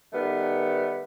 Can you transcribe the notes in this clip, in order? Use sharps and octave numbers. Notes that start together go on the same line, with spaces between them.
D#3 G3 A3 B3